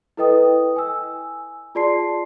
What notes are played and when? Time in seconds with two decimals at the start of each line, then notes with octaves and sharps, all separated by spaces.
0.17 E4 A4 B4 D#5 G5 D#6
0.76 G#5 E6
1.75 F4 G#4 D5 A5 C6 C7